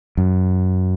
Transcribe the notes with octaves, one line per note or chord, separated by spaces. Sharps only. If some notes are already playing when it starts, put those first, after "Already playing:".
F#2